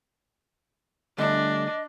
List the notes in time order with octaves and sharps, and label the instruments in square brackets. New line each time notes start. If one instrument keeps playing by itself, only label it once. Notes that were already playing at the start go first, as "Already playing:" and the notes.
[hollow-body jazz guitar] D3 G3 A3 [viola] D4 [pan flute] D#5